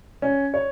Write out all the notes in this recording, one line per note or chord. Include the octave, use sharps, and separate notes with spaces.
C#4
C#5